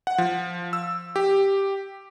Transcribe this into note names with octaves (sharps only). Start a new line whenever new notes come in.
F#5
F3
E6
G4